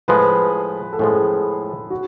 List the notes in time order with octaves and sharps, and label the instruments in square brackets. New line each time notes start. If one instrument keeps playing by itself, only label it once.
[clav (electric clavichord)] A2 F3 G#3 [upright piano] B4
[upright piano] A4
[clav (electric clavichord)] A2 F3 G#3 [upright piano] G#4
[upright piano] F#4